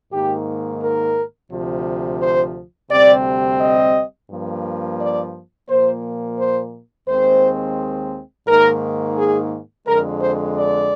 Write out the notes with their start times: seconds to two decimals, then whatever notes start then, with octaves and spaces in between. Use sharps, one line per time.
0.13 G#2 D#3 A#3 G4
0.82 A#4
1.52 D2 C3 F3
2.22 C5
2.91 D2 C3 G3 C4 D5
3.61 D#5
4.31 G2 F3 A#3
5.00 D5
5.70 A#2 F3 A#3 C5
6.39 C5
7.09 D#2 D#3 G#3 C4 C5
8.48 G#2 D#3 A#3 A#4
9.18 G#4
9.87 F2 D3 G#3 A#4
10.22 C5
10.57 D5